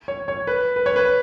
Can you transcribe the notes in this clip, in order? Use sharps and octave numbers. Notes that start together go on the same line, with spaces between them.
C#5
C#5
B4
B4
C#5
B4